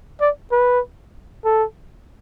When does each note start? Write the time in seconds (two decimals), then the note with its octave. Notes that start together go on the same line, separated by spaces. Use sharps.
0.21 D5
0.52 B4
1.45 A4